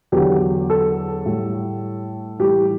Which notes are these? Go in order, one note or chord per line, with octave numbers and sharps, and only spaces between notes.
E2 D3 F#3 G4
A4
A2 G3
A2 E3 G3 G4